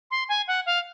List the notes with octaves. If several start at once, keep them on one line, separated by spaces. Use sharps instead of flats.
C6
G#5
F#5
F5